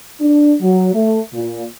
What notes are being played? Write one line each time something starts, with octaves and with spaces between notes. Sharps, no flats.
D4
F#3
A3
A#2